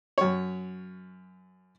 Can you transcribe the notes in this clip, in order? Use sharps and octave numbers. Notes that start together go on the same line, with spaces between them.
F#2 C#5